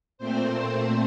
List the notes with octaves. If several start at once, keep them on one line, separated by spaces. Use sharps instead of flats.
A#2 A3 C4 C5